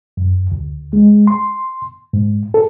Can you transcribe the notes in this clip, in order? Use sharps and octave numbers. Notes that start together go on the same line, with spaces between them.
F#2
D2
G#3
C6
G#2
A4